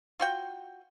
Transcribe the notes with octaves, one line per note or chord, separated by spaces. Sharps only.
F4 F#4 G5